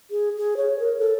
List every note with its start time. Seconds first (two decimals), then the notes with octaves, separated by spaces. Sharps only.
0.11 G#4
0.37 G#4
0.57 C#5
0.79 A#4
0.98 A4